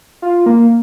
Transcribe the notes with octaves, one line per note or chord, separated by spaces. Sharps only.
F4
A#3